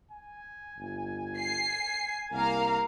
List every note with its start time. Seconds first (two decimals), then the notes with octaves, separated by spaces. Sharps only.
0.11 G#5
0.78 G1
1.37 C7
2.32 C2 A#3 F5 A#5